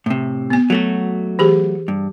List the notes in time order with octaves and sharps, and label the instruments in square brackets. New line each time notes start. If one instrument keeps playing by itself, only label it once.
[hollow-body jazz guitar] A2 C3
[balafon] B3 G#5
[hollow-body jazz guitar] F#3 A3 F#4
[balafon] E3 G4 G#4
[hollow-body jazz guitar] G2